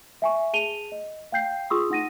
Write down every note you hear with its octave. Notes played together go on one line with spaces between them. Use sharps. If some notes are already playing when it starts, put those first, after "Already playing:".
E5 G#5 C#6
G#4 A5 D#7 F7 G7
D#5
F5 G5 G6 C7
F4 G#4 C6 C#6 D#6 E6
D#4 F#5 A#6 D#7